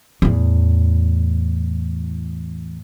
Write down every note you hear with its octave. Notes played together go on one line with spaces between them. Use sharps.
E2 A2